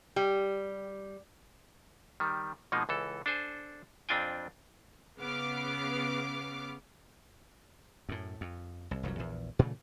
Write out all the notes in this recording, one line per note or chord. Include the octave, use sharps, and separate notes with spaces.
G3 G4
D#3 G3
B2 F3 G#3 A#3 D#4
C#2 E3 A4
D4 A4 C5 G#5
F2 C4 D4 F4 G5 G#5
C#3 B3 D6 F6 C7
F#2 A2
F2
C2
F1 C2 G2 F#3
A#1 E2
A#2 C#3 E3 A3